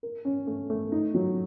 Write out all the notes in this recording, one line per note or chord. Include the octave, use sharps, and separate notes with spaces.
A#4
C#4
A3
A3
D#4
F#3